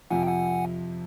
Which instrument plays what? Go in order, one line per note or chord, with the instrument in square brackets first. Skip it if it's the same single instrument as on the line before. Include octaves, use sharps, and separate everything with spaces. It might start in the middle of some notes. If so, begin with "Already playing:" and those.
[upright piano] F2 C3 F3 [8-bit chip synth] F#5 G#5
[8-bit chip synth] G5
F#5 G#5